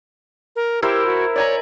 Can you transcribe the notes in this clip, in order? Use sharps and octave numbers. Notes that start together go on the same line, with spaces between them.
A#4
E4 G4 A#4 C5
F#4
C#5 D5 G#5 A#5